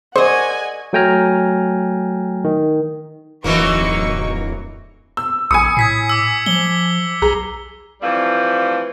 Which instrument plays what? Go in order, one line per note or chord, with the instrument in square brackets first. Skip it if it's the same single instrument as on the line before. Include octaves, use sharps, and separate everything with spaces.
[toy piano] G#4 A#4 D5 [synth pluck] C5 [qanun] D#5 C#6 [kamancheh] F#5 G#5
[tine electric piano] F#3 A3 G5 G#5 A#5 F6
D#3
[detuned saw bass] D1 [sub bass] F2 [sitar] E3 F#3 A#3 [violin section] D#4 C#6
[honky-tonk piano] E6
[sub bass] A#1 [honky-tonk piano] G#5 B5 D#6 [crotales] C#7
[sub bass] A2 [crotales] G#6 B6 C7
[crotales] D6 E6
[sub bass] F3 [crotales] G7
[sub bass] B1 [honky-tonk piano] G#4 A#5
[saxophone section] E3 F3 G3 A3 C4